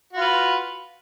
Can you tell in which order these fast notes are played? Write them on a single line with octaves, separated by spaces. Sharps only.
F#4 F4 B4